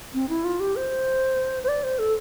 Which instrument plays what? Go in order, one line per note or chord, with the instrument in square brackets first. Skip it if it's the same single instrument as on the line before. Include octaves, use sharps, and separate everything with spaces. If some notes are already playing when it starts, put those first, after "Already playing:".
[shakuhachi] C4
E4
F4
G4
C5
C5
D5
C5
A4